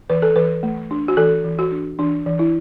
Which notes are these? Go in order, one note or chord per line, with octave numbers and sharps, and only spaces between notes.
E3 B4
A4
E3 B4
A3
D4
F#4
E3 A4
E3
F#4
D4
E3 D4
E3
E4